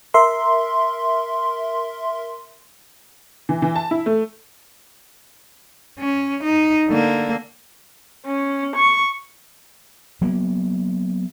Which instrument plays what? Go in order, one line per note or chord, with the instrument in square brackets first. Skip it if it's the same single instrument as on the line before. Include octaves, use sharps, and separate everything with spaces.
[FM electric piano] A#4 E5 C6
[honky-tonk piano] E3
E3
A5
E4
A3
[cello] C#4
D#4
D3 A#3
[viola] C#4
C#6
[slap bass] F#3 A#3 B3